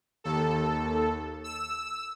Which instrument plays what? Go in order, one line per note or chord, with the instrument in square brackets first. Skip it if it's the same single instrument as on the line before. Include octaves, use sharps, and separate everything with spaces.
[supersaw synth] D#2 A4
E6